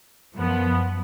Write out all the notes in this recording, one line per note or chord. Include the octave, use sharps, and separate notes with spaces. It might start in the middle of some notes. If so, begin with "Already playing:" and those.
F#2 F3 B3